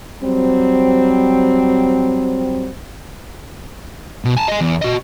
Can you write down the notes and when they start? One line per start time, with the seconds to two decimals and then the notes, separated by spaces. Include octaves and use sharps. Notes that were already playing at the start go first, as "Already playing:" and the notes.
0.22 F#3 G3 C4
4.25 B2
4.37 G#5 A5
4.48 D#5 G#5
4.61 E2
4.82 F#4 D#5